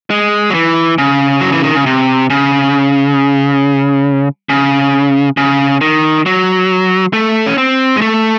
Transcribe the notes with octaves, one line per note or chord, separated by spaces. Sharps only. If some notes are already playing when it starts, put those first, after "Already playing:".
G#3
F#3
E3
C#3
F#3
E3
D#3
C#3
C3
C#3
C#3
C#3
D#3
F#3
A3
C#4
C4
G#3
A3